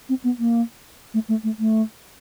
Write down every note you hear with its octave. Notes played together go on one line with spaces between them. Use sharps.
C4
B3
A#3
A3
A3
A3
A3